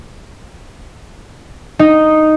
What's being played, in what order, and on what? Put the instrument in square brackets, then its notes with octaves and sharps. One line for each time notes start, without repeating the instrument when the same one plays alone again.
[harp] D#4